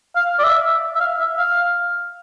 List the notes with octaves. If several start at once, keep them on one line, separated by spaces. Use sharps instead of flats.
F5
D5
E5
E5
F5
E5
F5